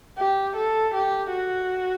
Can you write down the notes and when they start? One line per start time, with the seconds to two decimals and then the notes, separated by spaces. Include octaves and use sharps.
0.18 G4
0.56 A4
0.95 G4
1.33 F#4